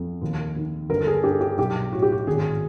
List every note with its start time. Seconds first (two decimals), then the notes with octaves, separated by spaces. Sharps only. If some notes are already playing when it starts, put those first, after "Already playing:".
Already playing: F2
0.22 D#2
0.56 D#3
0.90 G1 A#4
1.01 A4
1.07 G#4
1.24 G2 G4
1.41 G4
1.58 B1 G4
1.92 A2 F#4
2.02 G4
2.12 F#4
2.27 G#1 G#4